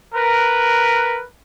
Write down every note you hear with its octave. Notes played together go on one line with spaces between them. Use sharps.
A#4 B4